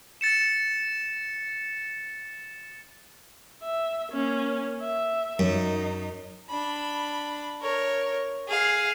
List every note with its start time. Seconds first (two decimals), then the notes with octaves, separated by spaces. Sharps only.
0.21 A6 C#7 E7
3.63 E5
4.11 A#3 C#4
4.81 E5
5.39 F#2 D#4
6.49 D4 B5
7.61 A#4 C#5
8.48 G#4 F5